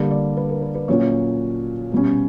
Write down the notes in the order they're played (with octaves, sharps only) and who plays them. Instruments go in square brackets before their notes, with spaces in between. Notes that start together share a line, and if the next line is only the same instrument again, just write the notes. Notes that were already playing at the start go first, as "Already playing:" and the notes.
Already playing: [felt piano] D3 G3 A#3 D5
D5
B4
A#4
B4
B4
A#2 F#3 C#4 C#5
B2 G3 C#4